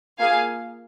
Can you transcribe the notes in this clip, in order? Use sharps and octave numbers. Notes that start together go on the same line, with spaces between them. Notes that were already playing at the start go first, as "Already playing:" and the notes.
A#3 F4 G#4 F5 G#5